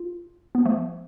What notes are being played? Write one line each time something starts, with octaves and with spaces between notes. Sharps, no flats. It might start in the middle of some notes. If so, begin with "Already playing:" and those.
Already playing: F4
B3
F3 A3